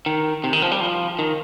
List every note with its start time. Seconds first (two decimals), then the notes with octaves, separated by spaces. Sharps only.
0.06 D#3
0.44 C3
0.53 D#3
0.62 F3
0.71 G3
0.80 F3
1.19 D#3